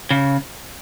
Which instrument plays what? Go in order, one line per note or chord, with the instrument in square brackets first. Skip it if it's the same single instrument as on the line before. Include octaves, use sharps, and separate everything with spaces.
[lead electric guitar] C#3